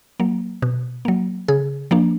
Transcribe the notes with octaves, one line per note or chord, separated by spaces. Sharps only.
F#3 A#3
B2
F#3 A#3
C#3 G#4
F3 A#3 D4